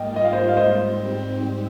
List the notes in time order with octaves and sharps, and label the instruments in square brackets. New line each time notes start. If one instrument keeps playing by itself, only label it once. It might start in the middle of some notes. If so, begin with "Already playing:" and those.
Already playing: [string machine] G#2 G3 A#3 F4 [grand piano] D#5 G5
[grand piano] D#5
F5
C5 D#5
F5
[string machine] G#2 G3 C4 [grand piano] C5 D#5